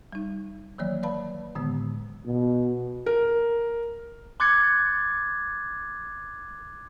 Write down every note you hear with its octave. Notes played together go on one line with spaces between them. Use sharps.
G3 D#4
D#3 E3 F#3 A#3 C#5 D5
B4 D5 F5 A5 B5
A2 D3 D#3 G#3 B3
B2
A#4
C6 D6 F#6 G#6 A6 C#7